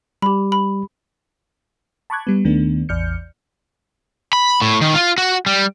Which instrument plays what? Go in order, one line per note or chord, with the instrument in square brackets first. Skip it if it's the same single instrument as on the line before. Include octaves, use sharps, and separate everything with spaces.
[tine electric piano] G3 [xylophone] G4 B5
[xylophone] B5
[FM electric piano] A5 B5 C#6 D6 F#6 G#6
G3 B3
D#2 D#3 A3 B3 D4
A1 E2 D5 F6 G6 C#7
[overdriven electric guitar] B5
A2
D#3
F4
F#4
G3